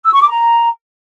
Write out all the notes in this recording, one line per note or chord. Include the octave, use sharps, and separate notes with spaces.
E6
C#6
D6
A#5